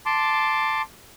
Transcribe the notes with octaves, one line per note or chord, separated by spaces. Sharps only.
A5 C6 D6